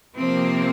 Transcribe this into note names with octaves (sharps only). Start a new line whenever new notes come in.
C3 F3 A#3 C4